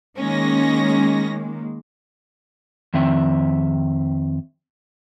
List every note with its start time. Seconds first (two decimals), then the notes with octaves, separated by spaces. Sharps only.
0.17 D#3 G#3 A#3 C#4 A#6
2.94 F2 D#3 C4 E5